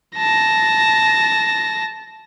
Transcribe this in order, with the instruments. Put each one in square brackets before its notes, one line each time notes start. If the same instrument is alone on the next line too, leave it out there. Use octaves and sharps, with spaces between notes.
[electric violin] A5 A#6